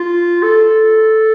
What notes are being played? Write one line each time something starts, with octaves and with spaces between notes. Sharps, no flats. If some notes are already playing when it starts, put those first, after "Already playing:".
Already playing: F4
A4